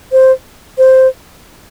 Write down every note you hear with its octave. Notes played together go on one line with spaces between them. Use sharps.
C5
C5